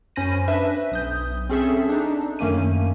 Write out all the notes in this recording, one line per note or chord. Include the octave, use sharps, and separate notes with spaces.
F#2 C#4 C5 B5 A#6 D#7
D4 B4 E5
B1 D#6 G6
C4 C#4 G#4 A4 E5
D4 D#4
F#2 D#3 A3 A#3 C#4 D#7